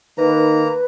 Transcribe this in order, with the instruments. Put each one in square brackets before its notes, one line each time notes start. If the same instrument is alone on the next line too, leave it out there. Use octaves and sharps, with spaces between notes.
[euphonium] D#3 [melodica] A#3 A#5 [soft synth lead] B4